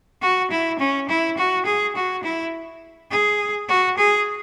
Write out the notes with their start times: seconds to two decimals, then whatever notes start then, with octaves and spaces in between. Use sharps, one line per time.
0.22 F#4
0.51 E4
0.79 C#4
1.09 E4
1.38 F#4
1.66 G#4
1.96 F#4
2.24 E4
3.11 G#4
3.68 F#4
3.98 G#4